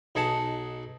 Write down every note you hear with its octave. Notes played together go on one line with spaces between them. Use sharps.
B1 D#4 G#4 F#5 A5